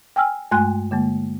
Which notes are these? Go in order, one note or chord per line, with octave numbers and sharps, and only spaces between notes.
G5 G#5 E6 F6
G2 G#3 A3 G#5 C6 F#6
D3 G#3 A#3